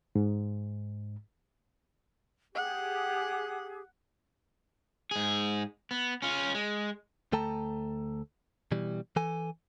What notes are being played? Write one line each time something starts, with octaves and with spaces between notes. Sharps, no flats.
G#2
G4 G#4 F#5
G#2 G#4
B3
C#4 F4
G#3
D2 A3 A4 G5 A5 A#5
B2 E3 G3
E3 A4 G#5